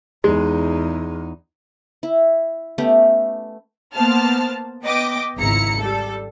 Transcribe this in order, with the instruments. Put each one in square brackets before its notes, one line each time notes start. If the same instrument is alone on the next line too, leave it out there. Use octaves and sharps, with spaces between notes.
[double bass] E2 D#4 [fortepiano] G#3
[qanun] E4
A3 B3 C#4 G4
[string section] A#3 B3 C5 A5 F6
B3 D#5 G5 D6
G#1 C#2 E4 A#5 C#7
G3 A4